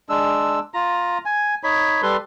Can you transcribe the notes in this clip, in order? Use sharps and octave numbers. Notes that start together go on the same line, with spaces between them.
G#3 D4 E6
F4 A#5
G#5
D#4 C#5 B5
G3 A4 B4 C6